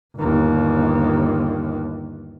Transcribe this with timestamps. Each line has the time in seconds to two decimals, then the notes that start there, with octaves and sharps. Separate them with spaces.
0.17 G1 D#2